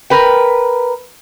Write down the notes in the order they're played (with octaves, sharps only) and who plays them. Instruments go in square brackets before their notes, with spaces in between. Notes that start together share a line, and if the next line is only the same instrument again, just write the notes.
[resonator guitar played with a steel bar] A#4 B4 G5